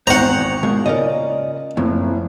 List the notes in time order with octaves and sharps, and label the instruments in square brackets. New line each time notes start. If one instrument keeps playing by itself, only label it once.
[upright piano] G#1 E2 [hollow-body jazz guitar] C5 G5 [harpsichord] F#5 A#5
[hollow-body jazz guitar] B2 G#3 A#3
[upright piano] A#2 C#3 [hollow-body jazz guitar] A#4 D5 D#5
[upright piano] F#1 [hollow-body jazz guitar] F2 A2